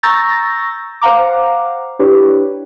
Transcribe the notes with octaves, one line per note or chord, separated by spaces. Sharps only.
A#5 C#6 E6 G6 A6 A#6
C5 F5 F#5 A#5 D6
D4 E4 G4 B4 C#5